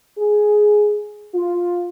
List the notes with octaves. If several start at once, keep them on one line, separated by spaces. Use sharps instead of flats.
G#4
F4